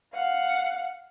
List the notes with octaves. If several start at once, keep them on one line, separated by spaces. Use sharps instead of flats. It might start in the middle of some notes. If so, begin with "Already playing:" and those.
F5 F#5